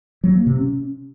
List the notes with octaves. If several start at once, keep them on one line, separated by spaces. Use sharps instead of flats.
F#3
A#3
C3
C#4